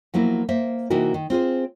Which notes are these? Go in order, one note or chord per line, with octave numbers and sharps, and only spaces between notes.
F3 F#3 A#3 B3 E4
A#3 C5 E5
C3 E3 A#3 D#4 F#4 A#4
D#3
C4 F4 G#4 C5